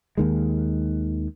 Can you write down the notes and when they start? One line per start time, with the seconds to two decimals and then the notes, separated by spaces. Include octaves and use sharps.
0.17 D#2 D#3 G#3